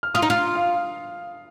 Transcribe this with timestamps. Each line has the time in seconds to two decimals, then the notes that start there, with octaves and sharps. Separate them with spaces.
0.03 F6
0.14 F4 D#6
0.22 D#4
0.30 F4
0.55 F5